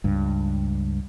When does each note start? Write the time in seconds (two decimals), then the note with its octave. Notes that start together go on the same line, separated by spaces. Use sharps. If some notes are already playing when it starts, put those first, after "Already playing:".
0.04 C#2 G2